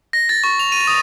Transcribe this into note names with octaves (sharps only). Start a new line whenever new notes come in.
A#6
A6
C#6
F7
D#7
D#6